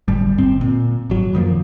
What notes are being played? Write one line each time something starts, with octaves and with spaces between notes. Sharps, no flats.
D1 G1 G3
G1 C4
A#2
G#1 F#3
F#2 D#3 F3 A#3